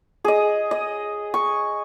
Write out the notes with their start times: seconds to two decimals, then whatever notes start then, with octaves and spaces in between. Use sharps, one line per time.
0.24 G#4 D#5
0.71 D#5
1.34 C#6